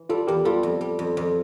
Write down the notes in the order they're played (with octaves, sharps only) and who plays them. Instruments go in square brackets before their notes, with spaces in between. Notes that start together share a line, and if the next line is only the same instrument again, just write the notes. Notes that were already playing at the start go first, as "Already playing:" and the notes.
Already playing: [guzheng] E3
[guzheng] G3 [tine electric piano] F4 A4
[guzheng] E2 [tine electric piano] G4 A#4
[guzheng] G3 [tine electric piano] F4 A4
[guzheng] F2
G3
F2
F2